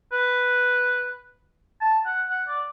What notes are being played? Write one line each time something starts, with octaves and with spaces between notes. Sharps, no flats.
B4
A5
F#5
F#5
D5